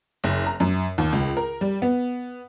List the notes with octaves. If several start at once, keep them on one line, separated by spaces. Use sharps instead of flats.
F#1
A#5
F#2
D#2
C#2
A#4
G3
B3